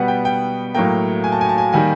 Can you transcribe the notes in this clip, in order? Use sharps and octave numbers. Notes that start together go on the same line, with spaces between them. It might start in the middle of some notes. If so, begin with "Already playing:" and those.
Already playing: B2 G3 B3 F#5
G5
G5
A2 F#3 A#3 G5
G#5
A5
G#5
A5
G#5
D#3 G3 A#3 G#5